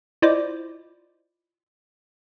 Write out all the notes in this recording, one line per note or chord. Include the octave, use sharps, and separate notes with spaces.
E4 F4 C5 D5 D#5 D6